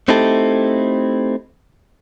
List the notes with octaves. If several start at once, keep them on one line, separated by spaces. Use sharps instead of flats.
A3 C4 D#4 E4 G4 A4